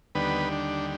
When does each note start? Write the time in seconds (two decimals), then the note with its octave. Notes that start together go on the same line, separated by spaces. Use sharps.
0.15 D#2 D3 G3 B3 B4
0.52 D4